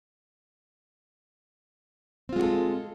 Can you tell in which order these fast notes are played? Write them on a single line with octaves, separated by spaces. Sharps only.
C4 F4 G#3 F#4 A4